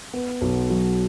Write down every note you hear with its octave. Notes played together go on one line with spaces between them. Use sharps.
B3
B1
F#3